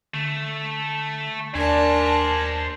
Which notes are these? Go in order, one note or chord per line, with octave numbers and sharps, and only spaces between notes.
D3 A3
D#2 D4 A#4 C5 G#5 A5